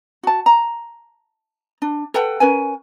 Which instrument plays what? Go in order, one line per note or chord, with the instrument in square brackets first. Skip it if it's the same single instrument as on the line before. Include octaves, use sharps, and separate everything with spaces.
[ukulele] F#4 A5
A#5
D4
A4 B4 F#5 G5
C#4 A#4 B4 G#5